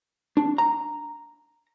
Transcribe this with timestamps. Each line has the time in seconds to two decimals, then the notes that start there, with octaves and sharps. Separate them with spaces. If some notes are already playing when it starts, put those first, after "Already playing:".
0.37 D4
0.58 A#5